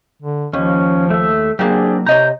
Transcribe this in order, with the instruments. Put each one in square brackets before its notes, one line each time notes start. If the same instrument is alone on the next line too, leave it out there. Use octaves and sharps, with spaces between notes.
[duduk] D3
[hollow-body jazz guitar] D#2 [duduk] F3 [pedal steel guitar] C#4
[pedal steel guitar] A3 E5
[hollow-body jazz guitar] F#3 A#3 [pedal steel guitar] C4 D4 G4 [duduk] G#4
[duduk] C3 [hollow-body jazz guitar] C#5 D#5 A#5 [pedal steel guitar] G6